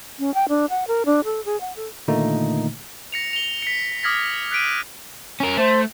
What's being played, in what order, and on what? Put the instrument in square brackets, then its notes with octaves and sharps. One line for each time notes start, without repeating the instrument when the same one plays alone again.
[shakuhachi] C#4
G5
D4
F#5
A#4
D4
A4
G#4
F#5
A4
[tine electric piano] A#2 D3 D#3 A3 A#3 D#4
[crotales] A#6 C#7 F7
F7 G7
B6 C#7
D6 D#6 F6 G#6 A#6 B6
F#6 B6 D7 D#7
[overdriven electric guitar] C#4 A#4
[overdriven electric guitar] A3 [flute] C5